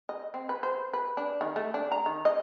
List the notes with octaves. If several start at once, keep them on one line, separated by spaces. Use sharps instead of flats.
D#5
C4
B4
C5
B4
D4
D#3
A3
D4
A#5
D#3
D#5